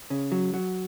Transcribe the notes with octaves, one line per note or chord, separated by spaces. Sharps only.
C#3
F#3
F#3